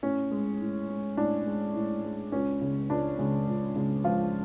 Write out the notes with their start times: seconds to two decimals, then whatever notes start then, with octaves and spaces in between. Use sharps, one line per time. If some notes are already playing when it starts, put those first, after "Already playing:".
0.03 A2 C#4
0.32 G#3
0.60 A2
0.89 G#3
1.17 A2 D4
1.46 G#3
1.75 A2
2.04 G#3
2.32 C#2 C#4
2.61 C#3 G#3
2.90 C#2 D4
3.18 C#3 G#3
3.47 C#2
3.76 C#3 G#3
4.04 C#2 F3 F4